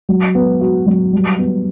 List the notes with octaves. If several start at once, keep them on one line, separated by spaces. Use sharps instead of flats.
F#3
B3
F#4
F#3
G3
B3